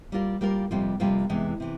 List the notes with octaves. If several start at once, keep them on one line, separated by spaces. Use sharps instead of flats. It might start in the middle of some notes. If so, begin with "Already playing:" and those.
G3 A#3 F4 A#4
G3 A#3 F4 A#4
F2 C3 G3 A#3 F4
F2 C3 G3 A#3 F4
E2 C3 E3 G#3
C3 E3